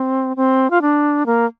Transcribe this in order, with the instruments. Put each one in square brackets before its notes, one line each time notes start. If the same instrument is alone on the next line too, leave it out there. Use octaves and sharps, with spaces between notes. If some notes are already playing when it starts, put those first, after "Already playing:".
Already playing: [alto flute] C4
C4
F4
D4
A#3